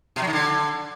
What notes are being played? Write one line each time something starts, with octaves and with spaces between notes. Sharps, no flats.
B2
F#3
D#3
D3